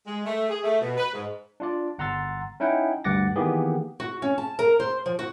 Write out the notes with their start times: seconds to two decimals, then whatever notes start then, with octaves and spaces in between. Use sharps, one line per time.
0.05 G#3
0.25 A3
0.49 G#4
0.63 A3
0.81 B2
0.97 B4
1.13 G#2
1.60 D4 F4 D5
1.98 G1 F#5 A#5 C6 E6 A6
2.60 C#4 D#4 E4 F#5 G5
3.04 D2 G2 F#5 D6 A6 A#6
3.36 D#3 E3 A#3 B3 G4 G#4
4.00 F#4
4.22 C#4
4.38 A5
4.59 A#4
4.80 C5
5.06 F3
5.19 F#4